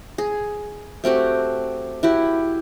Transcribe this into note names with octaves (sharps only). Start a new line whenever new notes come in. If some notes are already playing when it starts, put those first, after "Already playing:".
G#4
A3 C4 F#4 G4
E4 F#4 G4